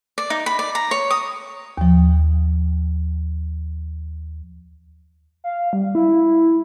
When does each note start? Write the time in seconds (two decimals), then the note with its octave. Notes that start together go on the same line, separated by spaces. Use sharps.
0.18 D5
0.30 D#4
0.46 B5
0.59 D5
0.75 A#5
0.91 C#5
1.11 D#6
1.78 D#2 F3
5.44 F5
5.73 G3
5.95 E4